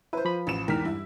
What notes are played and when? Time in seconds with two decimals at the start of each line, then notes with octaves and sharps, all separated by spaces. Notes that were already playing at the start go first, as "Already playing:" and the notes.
0.13 E4 B4 C5
0.25 F3 B5
0.47 A1 E7
0.68 E2 G#2 A#4 G5 F6 B6
0.85 G2 E4